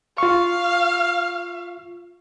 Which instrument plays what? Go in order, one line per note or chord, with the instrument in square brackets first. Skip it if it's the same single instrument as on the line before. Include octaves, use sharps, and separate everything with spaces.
[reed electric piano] F4 C#6 [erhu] F5